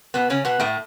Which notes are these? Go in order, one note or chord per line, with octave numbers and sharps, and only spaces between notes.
B2 B3
C#3 C#4
B2 B3
A2 A3